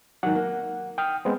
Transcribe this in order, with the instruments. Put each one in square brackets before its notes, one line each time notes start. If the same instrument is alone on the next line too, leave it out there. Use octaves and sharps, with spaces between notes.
[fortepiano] G#2 D#3 F#3 [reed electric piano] F#5
[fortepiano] A#3
[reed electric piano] G5 D#6 F6
G#3 B3 C4